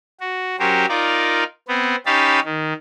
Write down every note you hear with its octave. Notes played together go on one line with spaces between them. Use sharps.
F#4
F#3 C#4 G4 A#4 C5
D#4 F4 A#4 D5
B3 C4
C#4 D#4 G4 F5 A5 B5
D#3